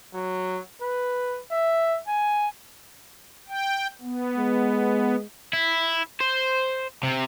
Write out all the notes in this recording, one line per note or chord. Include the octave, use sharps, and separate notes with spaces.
F#3
B4
E5
G#5
G5
B3
G#3
E4
C5
C3